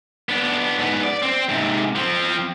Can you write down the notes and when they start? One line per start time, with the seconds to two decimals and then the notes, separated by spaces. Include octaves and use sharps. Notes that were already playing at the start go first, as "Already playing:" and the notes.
0.29 B3 D4
0.79 G#2 B3
1.03 D5
1.22 C4
1.49 G#2 C3
1.96 F3 C4